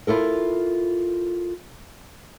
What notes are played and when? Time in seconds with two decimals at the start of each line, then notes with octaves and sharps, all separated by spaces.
0.07 E4 F4 A4 A#4